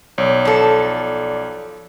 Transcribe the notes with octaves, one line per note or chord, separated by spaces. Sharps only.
B1 C#5 D5
F3 A4